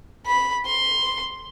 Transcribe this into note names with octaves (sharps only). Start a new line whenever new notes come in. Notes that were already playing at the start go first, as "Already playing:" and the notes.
B5
C6